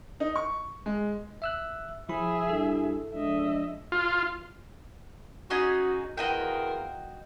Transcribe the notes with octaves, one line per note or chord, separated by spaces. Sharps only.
D#4
C#6
G#3
E5 E6 F#6
F3 E4 G#4 E5 B5
G2 E4 A4
F3 G#3 D4 D#5 E5
F4
C#4 D#4 F#4 G#4
E2 F4 F#4 A#4 D#5 G5